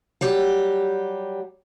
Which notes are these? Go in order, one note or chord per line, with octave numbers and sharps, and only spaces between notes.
F#3 G3 G4